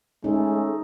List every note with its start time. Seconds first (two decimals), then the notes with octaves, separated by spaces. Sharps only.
0.24 G#3 A3 C#4 D#4 A4